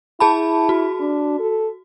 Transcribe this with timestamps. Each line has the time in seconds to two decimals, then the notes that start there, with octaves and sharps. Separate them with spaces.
0.20 E4 G#4 A5 B5
0.69 F#4
1.00 D4
1.40 A4